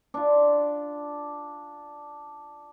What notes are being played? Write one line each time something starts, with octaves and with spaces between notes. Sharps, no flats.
D4 F4